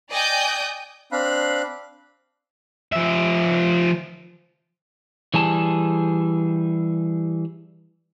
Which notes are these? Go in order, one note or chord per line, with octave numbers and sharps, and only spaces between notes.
D5 D#5 G5 G#5 D#6 G6
C4 D4 F5 B5 F#6
F3 E5
E3 G3 G#4 A5